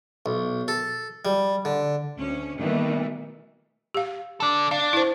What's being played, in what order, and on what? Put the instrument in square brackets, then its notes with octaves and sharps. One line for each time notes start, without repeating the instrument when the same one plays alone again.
[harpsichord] B1
A4
G3
D3
[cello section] D2 C#4
B2 D#3 E3 G3 A3 A#3
[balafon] G4 F5
[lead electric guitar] A4 D5
[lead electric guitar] D4 [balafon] F5
[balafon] E4 C5